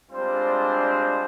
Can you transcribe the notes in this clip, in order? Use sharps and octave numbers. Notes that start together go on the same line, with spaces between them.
G3 G#3 C4 D4 F4 C5